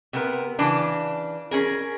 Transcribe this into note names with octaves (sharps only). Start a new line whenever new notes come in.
C3 B3 A#4
C#3 E3 D4
C#4 G#4 A#4